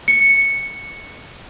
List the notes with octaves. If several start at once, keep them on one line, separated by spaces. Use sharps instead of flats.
C#7